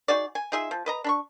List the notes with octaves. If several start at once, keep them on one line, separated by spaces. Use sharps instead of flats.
D#4 F#4 G#4 D5
G#5
D#4 F4 G#4 E5
F3
B4 D#5 A#5
D4 B5 C#6